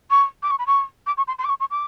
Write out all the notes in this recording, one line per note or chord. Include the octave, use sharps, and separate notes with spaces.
C#6
D6
C#6
B5
C#6
D6
C#6
C6
C6
D6
C#6
C#6
D6